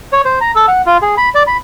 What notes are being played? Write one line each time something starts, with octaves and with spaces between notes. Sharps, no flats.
C#5
C5
A#5
A4
F#5
F4
G#4
B5
D5
B5